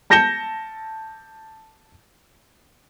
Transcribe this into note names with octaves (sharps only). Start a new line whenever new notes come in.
A5 G6 A#6 C#7 E7 G7